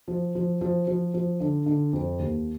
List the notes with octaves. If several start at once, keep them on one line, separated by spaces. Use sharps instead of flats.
F3
F3
F3
F3
F3
D3
D3
F2
D#2